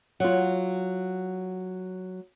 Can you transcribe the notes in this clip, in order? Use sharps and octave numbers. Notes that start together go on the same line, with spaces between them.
F#3 F4